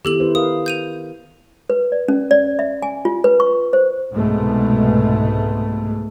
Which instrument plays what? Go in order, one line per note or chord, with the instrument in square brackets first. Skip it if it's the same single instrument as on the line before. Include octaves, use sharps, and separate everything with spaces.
[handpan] D#3 B3 E4 [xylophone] G4 A4 F#7
[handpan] E4 B4 C5
[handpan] A#4 B4 F5 [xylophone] D#6
[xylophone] G6 D#7 F7
[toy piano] B4
D5
C#4
D5
E5
G#5
F4
B4
C#6
C5
[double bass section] C2 G#2 B2 G#3 A3 B3